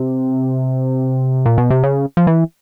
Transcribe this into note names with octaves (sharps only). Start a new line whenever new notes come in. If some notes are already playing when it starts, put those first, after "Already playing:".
Already playing: C3
A#2
B2
C3
C#3
F3
E3